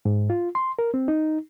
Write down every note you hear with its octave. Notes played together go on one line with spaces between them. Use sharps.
G#2
F4
C6
A#4
C4
D#4